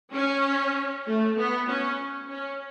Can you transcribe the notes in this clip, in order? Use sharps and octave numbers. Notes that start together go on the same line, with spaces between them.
C#4
A3
B3
C#4
C#4